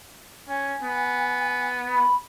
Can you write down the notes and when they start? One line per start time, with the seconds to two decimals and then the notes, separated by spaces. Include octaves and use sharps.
0.48 C#4 G#5
0.83 B3
1.90 B5